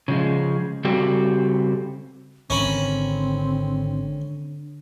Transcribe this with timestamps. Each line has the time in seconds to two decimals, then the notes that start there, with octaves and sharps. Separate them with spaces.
0.08 C#3 F3 G#3
0.84 C#3 G3 C4 F#4 G4 A4
2.50 G#1 D3 C4 C#4 A#4 B5